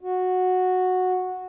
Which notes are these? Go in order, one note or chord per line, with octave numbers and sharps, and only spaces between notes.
F#4